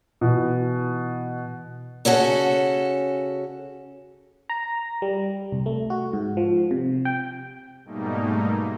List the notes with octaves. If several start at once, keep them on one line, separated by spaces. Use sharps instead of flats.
B2 E3
C#3 C#4 F#4 A4
A#5
G3
C2
A3
F#4
G#2
F3
C3
G5
G#2 B2 G3 A3 A#3 D#4